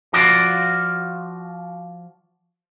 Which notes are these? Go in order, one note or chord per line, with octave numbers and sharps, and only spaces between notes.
F3 F4 F#4 D5